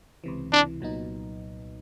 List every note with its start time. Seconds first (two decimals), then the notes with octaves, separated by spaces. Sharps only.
0.24 C#2 C3 E3
0.52 C#2 C3 E3 D4
0.80 C2 A#2 F#3 B3 D#4